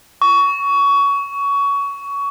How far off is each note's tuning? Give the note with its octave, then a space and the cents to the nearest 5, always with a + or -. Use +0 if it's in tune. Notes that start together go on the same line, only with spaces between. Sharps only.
C#6 +20